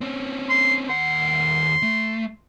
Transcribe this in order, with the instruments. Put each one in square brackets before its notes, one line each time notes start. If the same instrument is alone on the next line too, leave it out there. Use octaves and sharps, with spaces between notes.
[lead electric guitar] C4 C#4
[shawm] C6
[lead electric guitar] D#2 F#5 [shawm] C6
[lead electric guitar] A3